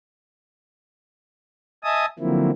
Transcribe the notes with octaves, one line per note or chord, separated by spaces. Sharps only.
D#5 E5 G#5 A5 D#6
D3 F3 F#3 A#3 C4 E4